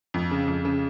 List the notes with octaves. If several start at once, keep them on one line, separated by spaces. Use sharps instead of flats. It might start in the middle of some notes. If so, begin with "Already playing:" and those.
F2
C#3
F2
C#3